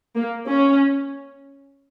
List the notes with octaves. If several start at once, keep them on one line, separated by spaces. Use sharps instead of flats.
A#3
C#4